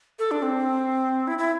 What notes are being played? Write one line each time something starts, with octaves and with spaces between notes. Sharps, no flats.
A4
D4
C4
E4
E4